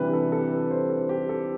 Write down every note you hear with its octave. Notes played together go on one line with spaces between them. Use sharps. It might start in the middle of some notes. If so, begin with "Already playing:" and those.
Already playing: C3 E3 G3 D4 B4
G4
A4
A4
B4
C5
A4
G4
A4